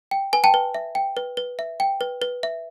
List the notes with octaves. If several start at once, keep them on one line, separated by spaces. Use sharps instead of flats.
G5
B4 G#5
G5 A5
B4
E5
G5
B4
B4
E5
G5
B4
B4
E5